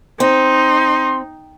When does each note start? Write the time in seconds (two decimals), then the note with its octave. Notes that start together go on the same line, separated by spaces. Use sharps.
0.20 C4 D#4 C6